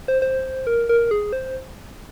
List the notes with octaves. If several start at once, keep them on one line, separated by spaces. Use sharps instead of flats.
C5
C5
A#4
A#4
G#4
C5